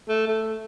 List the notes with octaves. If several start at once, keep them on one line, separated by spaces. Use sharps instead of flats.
A3
A3